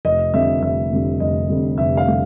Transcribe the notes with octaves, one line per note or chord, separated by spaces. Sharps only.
F1 D#5
F2 D3 G3 E5
F1 E5
F2 D3 G3
F1 D#5
F2 D3 G3
F1 E5
F5
D3 G3